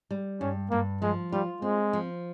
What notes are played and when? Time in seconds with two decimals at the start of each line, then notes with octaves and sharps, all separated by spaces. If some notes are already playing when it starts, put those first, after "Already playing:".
0.11 G3
0.41 G2 C#4
0.71 G2 A#3
1.02 F3 G#3
1.32 G3 F4
1.62 G#3 C4
1.93 F3